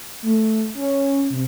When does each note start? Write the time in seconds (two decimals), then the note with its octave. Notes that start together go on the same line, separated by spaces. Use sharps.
0.22 A3
0.74 C#4
1.30 C3